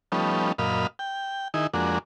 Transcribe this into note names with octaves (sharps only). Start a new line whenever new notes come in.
F3 G3 A3 B3 C#4 D#4
F#2 A#2 D#5 F5 B5
G5
D#3 D#4 E4 G#4
F2 G#3 A#3 D4 F#4